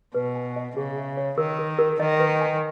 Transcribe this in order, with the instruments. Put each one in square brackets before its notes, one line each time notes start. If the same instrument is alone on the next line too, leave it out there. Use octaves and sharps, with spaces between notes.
[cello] B2 [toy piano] B4
[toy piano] G#5
D#5
[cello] C#3 [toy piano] G#4
[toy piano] E5
C#5
[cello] D#3 [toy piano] A#4
[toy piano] A#4
A#4
[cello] D#3 [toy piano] D#5
[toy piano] B4
G#5